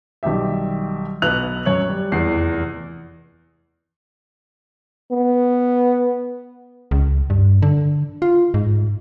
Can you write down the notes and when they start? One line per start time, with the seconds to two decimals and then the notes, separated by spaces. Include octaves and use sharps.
0.23 B1 D#3 G3 G4 E5
1.22 B1 B3 F#6 F7
1.65 F#2 C#5 F#7
1.88 G3
2.12 F1 E2 C7
5.12 B3
6.91 C#2
7.30 G2
7.62 D3
8.22 F4
8.54 G#2